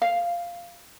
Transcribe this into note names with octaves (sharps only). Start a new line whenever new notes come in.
F5